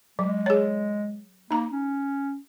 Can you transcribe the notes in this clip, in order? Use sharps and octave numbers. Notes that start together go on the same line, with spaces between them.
F#3 G#3
G#4 C#5
A#3 D#4 A#5
C#4